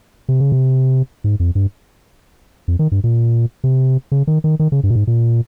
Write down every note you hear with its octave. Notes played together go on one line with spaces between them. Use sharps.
C3
C#3
C3
G#2
F2
G2
F2
D#3
G2
A#2
C3
C#3
D#3
D#3
D#3
C#3
G2
A#2
G#2
A#2